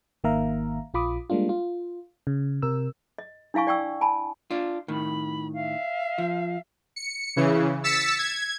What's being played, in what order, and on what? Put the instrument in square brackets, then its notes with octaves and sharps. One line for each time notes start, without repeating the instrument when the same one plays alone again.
[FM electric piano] G#1 D#3 A#3 E5 F5 A#5
A#1 F4 B5 D6 D#6
G3 G#3 A#3 D4 F4
F4
C#3
C3 A#4 E6
[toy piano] D#5
D4 E4 F5 G#5 C#6
D5 G5 C#6 E6
G#5 A5 B5
[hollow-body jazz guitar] D4 F4
[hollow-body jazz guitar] A2 D#3 [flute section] B5
[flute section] E5 F5
[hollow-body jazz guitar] F3
[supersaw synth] C#7
C#3 E3
E6 A6 B6 C#7 E7
G#6